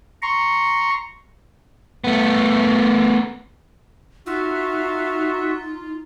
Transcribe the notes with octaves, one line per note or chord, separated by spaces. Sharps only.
A#5 C6 C#6
A3 B3
D#4 F4 F#4 E5